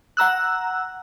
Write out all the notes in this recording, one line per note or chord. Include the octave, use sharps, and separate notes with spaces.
F#5 A#5 E6 F#6